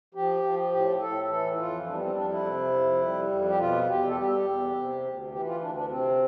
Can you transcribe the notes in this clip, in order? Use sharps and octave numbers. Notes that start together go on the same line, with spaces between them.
F3 G4
F3
A2 G4
A2 A4
E3 A4
F2 F4
G3 D4
B3
C4
F2 D4
E4
C3
F2
G3
F2
G4
B2 F4
E2 G4
A4
G3 G4
E2
C3
D2
E3 G4
F4
D2 D4
D4
C3 C4